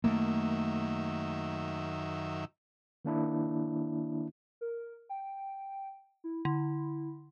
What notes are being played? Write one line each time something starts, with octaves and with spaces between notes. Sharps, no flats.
F#2 D#3 A3 A#3 E5
D#3 A#3 D4 E4
A#4
G5
E4
D3 E4